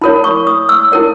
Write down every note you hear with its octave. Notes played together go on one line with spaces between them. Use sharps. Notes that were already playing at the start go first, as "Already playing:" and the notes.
E4 A#4 C#5 B5
C#6
D#6
E6
E4 A#4 C#5